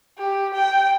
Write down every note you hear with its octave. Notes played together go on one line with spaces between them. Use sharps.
G4
G5